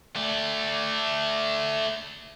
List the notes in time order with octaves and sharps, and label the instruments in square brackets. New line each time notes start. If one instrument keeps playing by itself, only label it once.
[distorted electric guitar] A3 D5